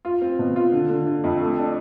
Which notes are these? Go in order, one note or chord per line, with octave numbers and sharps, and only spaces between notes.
F4
C4
B2
F4
D3
D3
D3
F2
A3
D4